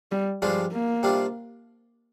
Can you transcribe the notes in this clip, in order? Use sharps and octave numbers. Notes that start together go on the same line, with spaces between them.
G3
G2 F3 G3 G#3 D4 F4
A#3
C3 G3 D4 F4